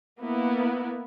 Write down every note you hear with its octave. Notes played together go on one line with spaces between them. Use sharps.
A#3 B3 E4